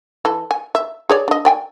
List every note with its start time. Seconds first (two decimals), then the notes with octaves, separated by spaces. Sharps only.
0.25 E3 A4
0.51 G#5
0.75 E5
1.09 G#4 C#5 D5
1.28 D4 D#5
1.45 D5 G5 G#5